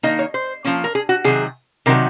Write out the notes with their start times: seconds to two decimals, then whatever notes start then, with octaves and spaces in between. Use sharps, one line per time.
0.03 D#3 A#3 D#4 D#5
0.19 C#5
0.34 C5
0.64 F3 A#3 C#4
0.84 A#4
0.95 G#4
1.09 F#4
1.24 C3 D#3 F#3 G#4
1.86 C3 D#3 F#3 A#4